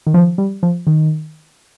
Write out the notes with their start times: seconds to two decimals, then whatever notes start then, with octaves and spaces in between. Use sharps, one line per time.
0.07 D#3
0.14 F3
0.38 G3
0.63 F3
0.87 D#3